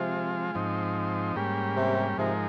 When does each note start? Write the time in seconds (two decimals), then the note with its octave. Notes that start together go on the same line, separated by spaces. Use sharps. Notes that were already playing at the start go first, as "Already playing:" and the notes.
Already playing: C3 F3 G#3 C4 F4
0.55 G#2 F3 C4 D#4
1.36 G#2 G3 A#3 C#4 G4
1.76 C3
2.17 G#2 C3 F3 G#3 D#4 A#4